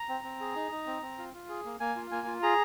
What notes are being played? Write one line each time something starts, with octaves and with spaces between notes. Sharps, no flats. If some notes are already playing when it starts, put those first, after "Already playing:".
Already playing: A#5
C4
C4
G#4
D#4
D#4
C4
C4
F4
F4
G#4
A#3
A#3 G#5
F4
A#3 G#5
F4
G#4 A#5